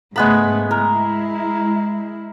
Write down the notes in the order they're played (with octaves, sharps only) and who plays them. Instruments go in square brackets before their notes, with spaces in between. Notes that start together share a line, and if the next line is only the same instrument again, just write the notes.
[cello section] G#2 C#3 A3 [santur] G#3 B3 B5
[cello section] G#3 E4 [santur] A#4